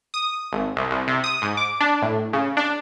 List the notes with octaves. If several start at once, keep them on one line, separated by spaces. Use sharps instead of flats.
D#6
G#1
C2
C2
C3
D#6
G#2
D6
D4
A2
C#3
D4